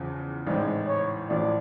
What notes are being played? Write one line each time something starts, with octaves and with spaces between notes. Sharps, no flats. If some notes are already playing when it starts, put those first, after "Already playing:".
Already playing: E2 C#3 F3
A1 G#2 E3 G#3 C4 D5
C#5
A1 A2 F3 D5